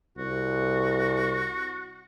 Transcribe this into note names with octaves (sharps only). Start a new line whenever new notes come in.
C2 F#4